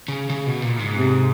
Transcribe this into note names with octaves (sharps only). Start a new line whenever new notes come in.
C#3
C#3
B2
A#2
G#2
C3